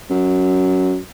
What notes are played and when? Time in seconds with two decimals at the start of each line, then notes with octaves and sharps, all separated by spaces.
0.10 F#2